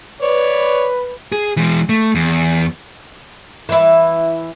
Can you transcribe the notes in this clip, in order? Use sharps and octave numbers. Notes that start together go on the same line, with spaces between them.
B4 C#5 D5
G#4
E3 G#3
A3
E2
E3 E4